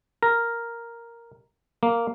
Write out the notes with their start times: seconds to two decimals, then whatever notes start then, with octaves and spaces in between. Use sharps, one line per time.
0.23 A#4
1.83 A#3